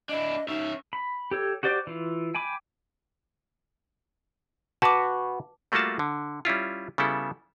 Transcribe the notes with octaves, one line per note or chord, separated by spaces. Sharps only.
D4 E4 D#5
C#4 D#4 E5
B5
G4 A4 C#5
F#4 G4 C5 D5 D6
E3 F4
G5 G#5 B5 D6
F#4 B4 A5 D6
G3 A3 A#3 F4 F#4 A5
D3
G3 C#4 E4 F4
C#3 G3 B3 E4 A4